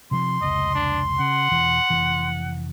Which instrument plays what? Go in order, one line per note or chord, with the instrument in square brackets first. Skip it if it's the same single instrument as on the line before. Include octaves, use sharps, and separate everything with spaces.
[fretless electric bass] C3 F3 [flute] C6
[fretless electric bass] F1 C#2 [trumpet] D#5
[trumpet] D4
[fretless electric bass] C#3 [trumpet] F#5
[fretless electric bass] E1 E3
F1 E3